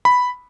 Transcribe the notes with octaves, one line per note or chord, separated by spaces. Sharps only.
B5